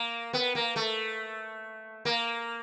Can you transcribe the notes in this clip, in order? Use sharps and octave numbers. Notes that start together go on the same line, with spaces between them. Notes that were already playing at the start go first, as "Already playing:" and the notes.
Already playing: A#3
B3
A#3
A3
A#3